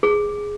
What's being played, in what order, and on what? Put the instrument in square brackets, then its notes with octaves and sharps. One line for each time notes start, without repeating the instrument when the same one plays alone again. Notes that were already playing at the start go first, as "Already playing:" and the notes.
[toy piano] G#4